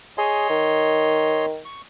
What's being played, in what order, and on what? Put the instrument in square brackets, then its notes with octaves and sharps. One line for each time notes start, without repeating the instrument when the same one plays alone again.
[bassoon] G#4 [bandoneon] C#5 D#5 C6
[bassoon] D#3
[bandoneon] C#6